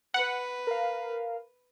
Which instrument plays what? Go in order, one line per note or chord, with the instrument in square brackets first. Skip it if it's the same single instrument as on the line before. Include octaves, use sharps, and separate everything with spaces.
[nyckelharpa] B4 [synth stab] F#5
[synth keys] A#4 F5